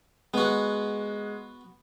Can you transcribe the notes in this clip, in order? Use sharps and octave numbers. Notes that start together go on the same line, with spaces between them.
G#3 B3 F#4